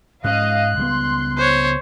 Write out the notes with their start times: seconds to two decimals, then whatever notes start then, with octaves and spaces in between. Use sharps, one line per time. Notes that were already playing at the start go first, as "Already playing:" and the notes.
0.24 G#2 G#3 C#4 D#5 F5 F#6
0.77 C#2 G3 B3 C6
1.37 C5 C#5